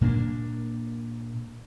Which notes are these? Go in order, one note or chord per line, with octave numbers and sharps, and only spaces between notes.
A#2 A#3 C4 D4